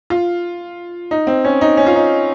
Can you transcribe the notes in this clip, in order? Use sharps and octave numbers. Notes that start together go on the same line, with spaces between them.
F4
D#4
C4
C#4
D#4
C#4
F4
D#4